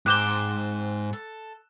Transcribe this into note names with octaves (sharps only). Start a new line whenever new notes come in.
G#2 C4 D6 F#6 G6 E7 G7
A4